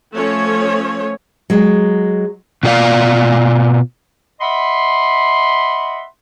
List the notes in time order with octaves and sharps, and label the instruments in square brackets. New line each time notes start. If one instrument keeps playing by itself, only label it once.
[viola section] F3 A3 C#4 C#5
[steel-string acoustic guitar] F#3 G#3
[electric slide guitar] B2 F4 G#4 D5 F5
[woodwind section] D#5 E5 F#5 B5 C6